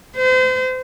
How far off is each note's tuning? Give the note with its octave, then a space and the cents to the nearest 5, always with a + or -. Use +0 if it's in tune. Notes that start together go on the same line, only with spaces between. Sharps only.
C5 -35